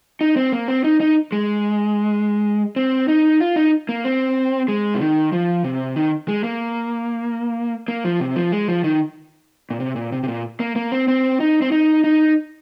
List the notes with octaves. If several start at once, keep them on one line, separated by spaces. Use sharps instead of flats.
D#4
C4
A#3
C4
D#4
D#4
G#3
C4
D#4
F4
D#4
A#3
C4
G#3
C3
D#3
F3
C3
D#3
G#3
A#3
A#3
F3
C3
F3
G#3
F3
D#3
A#2
C3
A#2
C3
C3
A#2
A#3
A#3
C4
C4
D#4
C4
D#4
D#4